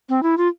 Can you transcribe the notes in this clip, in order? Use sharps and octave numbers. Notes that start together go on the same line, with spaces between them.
C4
E4
F4